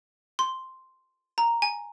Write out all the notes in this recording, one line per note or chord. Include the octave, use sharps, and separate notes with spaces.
C6
A#5
G#5